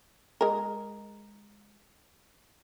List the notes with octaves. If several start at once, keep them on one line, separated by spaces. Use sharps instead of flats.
G#3 A#4